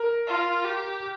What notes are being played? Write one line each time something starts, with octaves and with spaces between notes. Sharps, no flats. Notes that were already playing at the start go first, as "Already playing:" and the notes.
Already playing: A#4
F4
G4